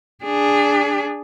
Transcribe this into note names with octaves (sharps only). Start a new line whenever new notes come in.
D4 G#4